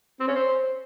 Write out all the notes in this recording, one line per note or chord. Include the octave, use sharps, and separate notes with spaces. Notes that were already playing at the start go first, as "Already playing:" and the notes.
C4
C#4
C5